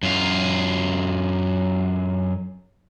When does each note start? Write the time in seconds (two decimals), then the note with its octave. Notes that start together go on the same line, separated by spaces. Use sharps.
0.03 F#2 F4